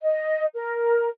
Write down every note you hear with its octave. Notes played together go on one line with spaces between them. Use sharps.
D#5
A#4